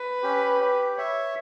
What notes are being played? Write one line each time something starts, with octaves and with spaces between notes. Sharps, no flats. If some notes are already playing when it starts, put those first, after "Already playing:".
Already playing: B4
C#4 G4
G4
C#5 E5